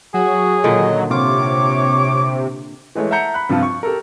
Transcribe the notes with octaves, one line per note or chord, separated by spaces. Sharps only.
F#3 F#4 G#4
A#2 D3 D#3 D#5
C3 F4 C#5 D6
E3 G#3 A3 C#5
E5 F#5 A5 A#5 G6 C#7
B5 F#6
G2 C3 F3 F4 A5
C#6
G4 A4 A#4